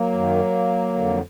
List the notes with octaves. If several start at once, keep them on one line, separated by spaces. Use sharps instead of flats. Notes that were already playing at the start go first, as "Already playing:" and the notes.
Already playing: F#3 A#3
F#2 D#3
F2 D3